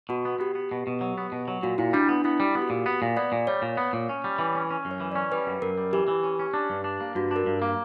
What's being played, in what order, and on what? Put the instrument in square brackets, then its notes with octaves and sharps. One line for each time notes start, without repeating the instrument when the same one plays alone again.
[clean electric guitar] B2 [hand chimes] F#4
[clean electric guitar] B3
[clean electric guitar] B3 [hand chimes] G4
[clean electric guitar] B3
B2
B2
F#3
B3
B2
F#3
[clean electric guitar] A#2 [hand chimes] F#4
[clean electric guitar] A#2 [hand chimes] E4
[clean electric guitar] G3 [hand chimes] D4
[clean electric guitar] B3 [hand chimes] D4
[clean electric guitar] B3 [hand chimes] E4
[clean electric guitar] G3
[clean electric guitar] B3 [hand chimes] G4
[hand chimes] F#4
[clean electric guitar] A#2 [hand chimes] G4
[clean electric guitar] B3
A#2
[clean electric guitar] B3 [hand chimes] D5
[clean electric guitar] A#2
[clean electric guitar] G3 [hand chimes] C#5
[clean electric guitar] A#2
B3
A#2
C#4
G3
E3
C#4
C#4
F#2
[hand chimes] C#5
[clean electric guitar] E3
[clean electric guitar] C#4 [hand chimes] D5
[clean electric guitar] G3 [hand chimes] B4
[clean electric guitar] F#2
[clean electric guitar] F#2 [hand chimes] A#4
[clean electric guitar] G3
[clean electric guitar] E3 [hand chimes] G4
[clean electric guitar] E3
C#4
C#4
D4
G2
D4
A#3
[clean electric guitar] G2 [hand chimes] F#4
[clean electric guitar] D4 [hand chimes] A#4
[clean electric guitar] G2
A#3